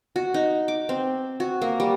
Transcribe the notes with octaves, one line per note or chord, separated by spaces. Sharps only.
F#4
D#4
D6
C4
F#4
A#3
G3